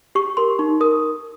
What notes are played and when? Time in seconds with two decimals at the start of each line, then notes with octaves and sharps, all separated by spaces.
0.15 G4 C#6
0.37 A#4 C6
0.59 D#4 C#6
0.80 A#4 D#6